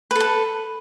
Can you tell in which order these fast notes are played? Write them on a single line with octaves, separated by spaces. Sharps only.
B4 A4 A5